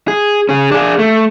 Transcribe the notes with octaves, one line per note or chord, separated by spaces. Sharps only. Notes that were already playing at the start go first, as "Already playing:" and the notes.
G#4
C#4 G#4
D4 G#4
A3